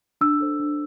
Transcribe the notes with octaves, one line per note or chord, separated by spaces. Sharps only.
D4 E6
A4 C5
D4